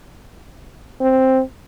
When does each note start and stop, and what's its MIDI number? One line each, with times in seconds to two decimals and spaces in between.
1.01 1.41 60